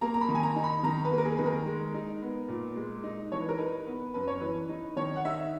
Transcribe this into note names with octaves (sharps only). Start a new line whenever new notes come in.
A#3 A#5
A#5
B5
D#3
G#5
A#5
D#4
B5
D#3 A#5
B4
A#3
A#4
G#4
D#3 B4
A#4
G#3
D#4
B3
A#2
G#3
D#4
E3 C#5
B4
A#4
D#4 B4
B3
F#2 B4
C#5
E3 B4
D#4
D#3 C#5
F#5
D#4 E5